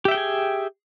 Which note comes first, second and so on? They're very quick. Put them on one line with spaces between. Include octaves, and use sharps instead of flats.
G4 E5 G5 G#4 G#5